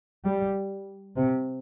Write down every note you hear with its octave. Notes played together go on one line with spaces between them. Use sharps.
G3
C3